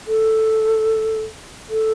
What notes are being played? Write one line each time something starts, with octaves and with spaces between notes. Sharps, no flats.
A4
A4